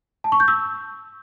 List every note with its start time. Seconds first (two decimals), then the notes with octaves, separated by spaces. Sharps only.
0.24 A5
0.32 C#6
0.40 G6
0.48 E6